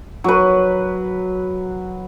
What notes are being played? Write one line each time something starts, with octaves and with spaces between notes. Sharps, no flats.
F#3 B4